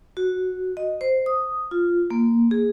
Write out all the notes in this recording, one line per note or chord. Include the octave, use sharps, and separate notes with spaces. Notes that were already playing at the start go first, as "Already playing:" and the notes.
F#4
D#5
C5
D#6
F4
A#3
G#4